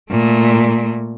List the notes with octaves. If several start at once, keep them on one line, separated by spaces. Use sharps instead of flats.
A#2 A3